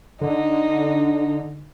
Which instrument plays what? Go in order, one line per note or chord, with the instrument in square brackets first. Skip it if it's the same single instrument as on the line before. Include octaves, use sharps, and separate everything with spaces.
[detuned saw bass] D3 [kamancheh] D#4